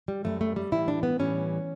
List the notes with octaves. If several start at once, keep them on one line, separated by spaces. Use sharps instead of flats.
G3
F#2 E3 G3 A3
A3
G3
A2 E3 G3 E4
D4
B3
A2 E3 G3 C#4